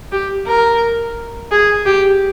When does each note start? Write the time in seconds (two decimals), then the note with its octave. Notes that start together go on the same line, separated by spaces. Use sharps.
0.12 G4
0.47 A#4
1.51 G#4
1.86 G4